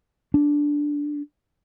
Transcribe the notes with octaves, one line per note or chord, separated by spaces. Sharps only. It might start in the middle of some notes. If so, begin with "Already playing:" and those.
D4